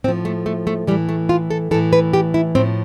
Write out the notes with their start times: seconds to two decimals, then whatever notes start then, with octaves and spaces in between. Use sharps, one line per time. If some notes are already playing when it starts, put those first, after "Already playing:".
0.04 A2 C4
0.08 F3
0.25 A3
0.46 A3
0.67 A3
0.87 A2 E3 G3
1.09 A3
1.29 F4
1.51 A4
1.71 E3 A4
1.74 A2
1.93 B4
2.13 G4
2.34 E4
2.55 A2 C4
2.58 F3